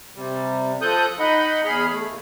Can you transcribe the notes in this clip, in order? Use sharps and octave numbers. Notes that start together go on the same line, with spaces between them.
C3 G3
F3 A4 D#6 F#6 G6
D#4 D#5 F#5 B5
E2 G#4 B5 F6
A3
D#2